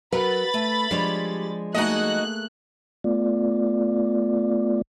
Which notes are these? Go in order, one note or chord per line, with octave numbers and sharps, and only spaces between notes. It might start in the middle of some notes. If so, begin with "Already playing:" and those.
F#3 A#4 B4 F#5 B5 A6
A3
F3 G3 G#3 D4 C#5
A3 A#3 D#4 F#4 G#4 D#5 F#6
A3 B3 F4 D5